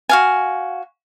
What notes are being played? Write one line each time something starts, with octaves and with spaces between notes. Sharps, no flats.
F#4 F5 G#5